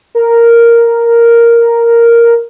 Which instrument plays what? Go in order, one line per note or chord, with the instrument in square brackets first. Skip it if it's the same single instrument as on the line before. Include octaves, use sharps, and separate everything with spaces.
[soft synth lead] A#4